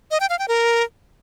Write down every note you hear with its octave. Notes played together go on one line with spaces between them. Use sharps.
D#5
G5
F5
G5
A#4